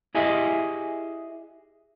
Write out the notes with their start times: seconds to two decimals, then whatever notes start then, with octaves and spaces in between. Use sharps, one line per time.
0.15 E4 G4 G#4 D#5 E5 G#5